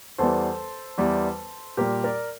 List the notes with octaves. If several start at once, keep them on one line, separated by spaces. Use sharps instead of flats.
E2 E3 G3 A4 C5
E2 E3 G3
A#2 G3 G4 A#4
A#4 D5